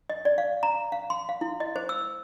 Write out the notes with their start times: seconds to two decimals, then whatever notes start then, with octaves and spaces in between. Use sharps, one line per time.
0.10 D#5
0.25 D5
0.38 F5
0.63 A#5
0.92 F5
1.10 C6
1.29 F5
1.41 E4
1.60 D#5
1.76 C5
1.89 E6